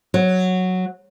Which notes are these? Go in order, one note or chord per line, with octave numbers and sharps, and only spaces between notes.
F#3